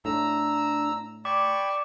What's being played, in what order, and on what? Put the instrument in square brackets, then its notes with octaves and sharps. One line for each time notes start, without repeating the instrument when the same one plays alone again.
[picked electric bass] A2 [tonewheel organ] D4 [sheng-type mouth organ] A#5 E6
[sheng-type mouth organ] D5 C#6 [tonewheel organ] G5 B5 G#6 [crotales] D6